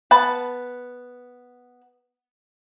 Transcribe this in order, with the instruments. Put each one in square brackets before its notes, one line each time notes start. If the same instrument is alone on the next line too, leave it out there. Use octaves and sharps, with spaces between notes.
[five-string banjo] B3 B4 A5